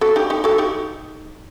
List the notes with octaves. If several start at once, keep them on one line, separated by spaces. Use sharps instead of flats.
F#4 A4
D#4 G4
D#4 G4
F#4 A4
D#4 G4